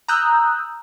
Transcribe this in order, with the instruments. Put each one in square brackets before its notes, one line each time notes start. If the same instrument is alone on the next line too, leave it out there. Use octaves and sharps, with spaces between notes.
[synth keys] A#5 D#6 E6 F#6 G6